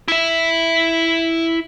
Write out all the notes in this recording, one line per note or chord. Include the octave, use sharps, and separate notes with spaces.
E4 E5